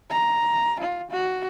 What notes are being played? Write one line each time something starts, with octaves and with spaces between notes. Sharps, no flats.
A#5
F4
F#4